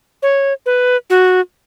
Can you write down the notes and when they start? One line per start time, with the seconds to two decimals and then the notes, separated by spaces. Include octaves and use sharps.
0.23 C#5
0.66 B4
1.10 F#4